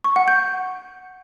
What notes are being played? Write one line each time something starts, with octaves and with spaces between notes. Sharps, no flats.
C#6
F#5
G6